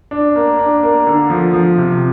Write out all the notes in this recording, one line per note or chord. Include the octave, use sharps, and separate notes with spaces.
D4
A#3
D4
A#3
D3
F3
F3
C3